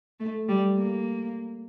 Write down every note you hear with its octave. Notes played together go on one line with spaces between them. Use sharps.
A3
G3
A#3